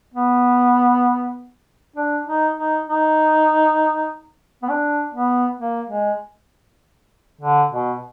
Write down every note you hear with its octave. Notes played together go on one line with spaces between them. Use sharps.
B3
D4
D#4
D#4
D#4
B3
D4
B3
A#3
G#3
D3
B2